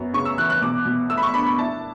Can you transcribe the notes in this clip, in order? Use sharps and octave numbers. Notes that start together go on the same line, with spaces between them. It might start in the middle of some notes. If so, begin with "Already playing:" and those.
Already playing: F#2 B3
C#3 C#6
E6
E3 F#6
F#6
B2 D6
B2
A3 E6
B5
C#6
D4 B5
B5
E4 A5